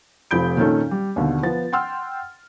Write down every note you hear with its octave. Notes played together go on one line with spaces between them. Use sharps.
F1 F3 B5 G6 D7
A#2 D#3 C#4 F4 A4
G3
D#2 B2 D3
F3 B3 A6
F#5 G5 C6 E6 F6